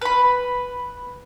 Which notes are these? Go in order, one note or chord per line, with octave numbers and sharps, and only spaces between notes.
B4 B5